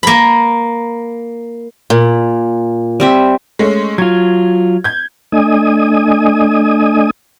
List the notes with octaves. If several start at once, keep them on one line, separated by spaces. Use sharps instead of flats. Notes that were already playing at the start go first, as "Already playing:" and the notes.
A#3 B5
A#2
G3 C4 E5
G#3 A3 C#4
F#3 F4 G#6
G6 G#6
A3 D4 D#5 G#5 D#6